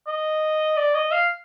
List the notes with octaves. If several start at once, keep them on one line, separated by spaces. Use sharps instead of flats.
D#5
D5
D#5
F5